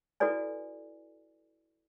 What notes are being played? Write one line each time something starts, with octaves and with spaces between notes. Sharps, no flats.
E4 F#4 A4 B4 D5 G#5